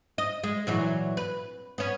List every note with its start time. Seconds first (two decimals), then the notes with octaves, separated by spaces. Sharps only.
0.18 D#5
0.44 G#3
0.67 A#2 E3 F#3
1.17 B4
1.78 B3 C#4